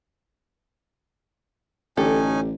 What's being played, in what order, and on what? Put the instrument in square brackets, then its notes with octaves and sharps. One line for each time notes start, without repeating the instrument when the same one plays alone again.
[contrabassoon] A1 [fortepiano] D3 G4 [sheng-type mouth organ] C#4 D#4 G#5 [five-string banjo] A4